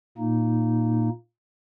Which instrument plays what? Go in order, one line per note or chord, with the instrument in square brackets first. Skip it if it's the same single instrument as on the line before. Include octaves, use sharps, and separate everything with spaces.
[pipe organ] A#2 A#3 D#4